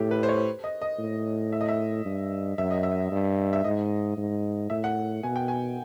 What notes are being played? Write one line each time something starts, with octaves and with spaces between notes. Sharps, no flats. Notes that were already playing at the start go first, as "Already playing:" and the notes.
Already playing: A2 G4 A4
B4
C5
C#5
D#5
D#5
A2
E5
D#5
E5
G2
F#2 E5
D#5
E5
G2
E5
G#2 D#5
G#2
A2 E5
F#5
B2 G#5
G5
G#5